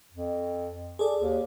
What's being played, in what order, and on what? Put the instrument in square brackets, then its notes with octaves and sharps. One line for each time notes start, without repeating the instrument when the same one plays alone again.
[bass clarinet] F2
[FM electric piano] G#4 A4 D5
[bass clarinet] D#2